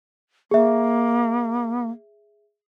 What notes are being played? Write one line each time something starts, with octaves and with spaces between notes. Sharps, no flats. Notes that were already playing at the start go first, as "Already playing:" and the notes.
A#3 G#4 E5